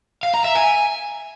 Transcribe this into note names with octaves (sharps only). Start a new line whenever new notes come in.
F5
A#5
E5
G#5